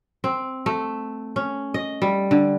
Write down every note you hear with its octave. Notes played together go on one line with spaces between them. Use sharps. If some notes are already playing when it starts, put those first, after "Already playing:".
C4
A3
C#4
D#5
G3
D3